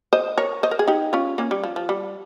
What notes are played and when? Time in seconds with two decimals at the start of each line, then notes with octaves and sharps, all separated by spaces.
0.13 C5 D#5
0.38 A#4 C#5
0.63 C5 D#5
0.71 A#4
0.79 G#4
0.87 D#4 G4
1.13 C#4 F4
1.38 A#3 C#4
1.51 G3
1.64 F3
1.76 F3
1.89 G3